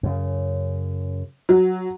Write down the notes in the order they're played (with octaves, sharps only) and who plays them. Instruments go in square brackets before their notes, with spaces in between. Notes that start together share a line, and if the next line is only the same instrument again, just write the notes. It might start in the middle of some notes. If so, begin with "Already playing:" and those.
[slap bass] F#2 C#3
[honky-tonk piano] F#3